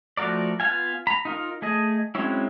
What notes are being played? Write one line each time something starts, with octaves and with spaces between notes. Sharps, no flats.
F3 A3 F#4 A#4 D5
B3 F4 F5 G#5
A#5 B5
D#4 F4 A#4
A3 G#4 D#5
F#3 G#3 C4 C#4 E4